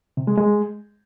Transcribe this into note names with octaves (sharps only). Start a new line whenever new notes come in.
C3
G#3
G#3